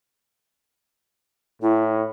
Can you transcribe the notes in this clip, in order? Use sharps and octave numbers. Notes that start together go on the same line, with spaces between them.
A2 E4